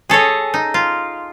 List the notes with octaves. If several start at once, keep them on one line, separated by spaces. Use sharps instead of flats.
G#4 A4 C#5 D#5
D#4
F4